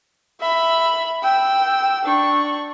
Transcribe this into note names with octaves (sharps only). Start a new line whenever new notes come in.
E5 B5
G5 E6
D4 C#6